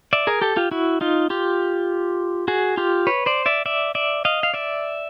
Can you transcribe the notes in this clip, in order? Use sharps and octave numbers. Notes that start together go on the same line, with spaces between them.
D5 E5
G#4 A#4
G4 A4
F4 G4
E4 F#4
D#4 F4
F4 G4
F#4 G#4
F4 G4
B4 C#5
C5 D5
D5 E5
D5 E5
D5 E5
D#5 F5
F5
D5 E5